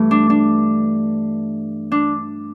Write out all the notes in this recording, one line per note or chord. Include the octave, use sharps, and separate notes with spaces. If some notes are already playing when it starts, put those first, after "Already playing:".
Already playing: G2 E3 A3
D4
D4
D4